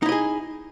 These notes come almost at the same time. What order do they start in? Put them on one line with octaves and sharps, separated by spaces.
D#4 E4 D#5 G#4